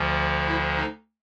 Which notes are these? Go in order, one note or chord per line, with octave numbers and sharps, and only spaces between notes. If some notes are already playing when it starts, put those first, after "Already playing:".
Already playing: D2 D3 F3
E4
D#4